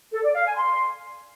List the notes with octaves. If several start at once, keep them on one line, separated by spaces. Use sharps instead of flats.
A4
D5
F5
G#5
C6